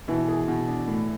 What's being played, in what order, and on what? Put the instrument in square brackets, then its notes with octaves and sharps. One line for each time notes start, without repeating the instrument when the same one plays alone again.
[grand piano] B2 [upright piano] E3
[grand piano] G#4
B2
D4
A2